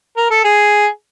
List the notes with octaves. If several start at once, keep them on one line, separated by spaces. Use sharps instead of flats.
A#4
A4
G#4